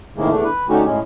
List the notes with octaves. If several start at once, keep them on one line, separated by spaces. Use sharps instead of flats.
A2 C3 D#3 G#3 A#3
E2 A3 D4
B4
D3 A3 C#4 D#4 F#4 G4
A2 G#3 C#4